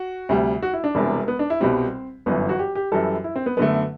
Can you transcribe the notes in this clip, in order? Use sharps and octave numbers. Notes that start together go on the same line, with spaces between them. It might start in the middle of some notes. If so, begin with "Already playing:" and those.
Already playing: F#4
D2 C3 G3
F#4
E4
D4
E1 E2 C3 G3
B3
D4
E4
C2 B2 G3 C4
G1 F#2 E3 B3
F#4
G4
G4
F#2 E3 G3 A4
E4
C4
B3
F#2 D3 A3 B3